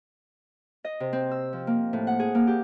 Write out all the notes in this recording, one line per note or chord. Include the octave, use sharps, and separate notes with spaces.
D#5
C3
C4
E6
F3
A#3
A2
F#5
G#4
A#3
G4